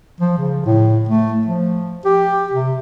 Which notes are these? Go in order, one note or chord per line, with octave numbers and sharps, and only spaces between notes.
F3
C#3
A2
A3
F3
G4
C3